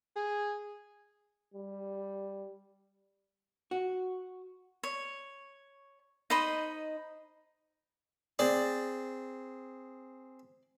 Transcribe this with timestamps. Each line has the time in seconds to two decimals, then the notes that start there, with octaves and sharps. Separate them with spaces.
0.16 G#4
1.54 G3
3.71 F#4
4.83 C#5
6.30 D#4 C5 D#5 B5
8.39 C4 G#4 D5